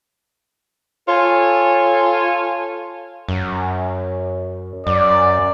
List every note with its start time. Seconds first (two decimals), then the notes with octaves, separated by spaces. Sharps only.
1.08 F4 A4 C#5 G#5
3.29 F#2
4.87 F#2 D5